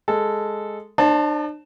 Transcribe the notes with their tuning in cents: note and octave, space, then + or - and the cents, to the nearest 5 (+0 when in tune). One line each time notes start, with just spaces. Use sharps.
G#3 +0 A4 +0
D4 +45 C5 +45 A5 +0